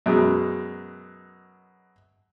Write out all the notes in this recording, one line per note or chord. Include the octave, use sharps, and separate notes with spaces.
F#2 B2 G#3